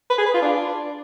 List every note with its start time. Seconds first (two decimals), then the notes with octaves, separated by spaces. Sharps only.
0.10 B4
0.18 G#4
0.26 B4
0.34 F4
0.42 D4